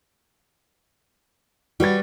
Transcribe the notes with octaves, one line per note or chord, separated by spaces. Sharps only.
G3 F#4 B4 C#5 A6